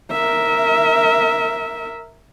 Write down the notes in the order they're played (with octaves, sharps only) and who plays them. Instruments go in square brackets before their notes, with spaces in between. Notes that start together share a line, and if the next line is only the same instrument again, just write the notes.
[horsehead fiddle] A#4 E5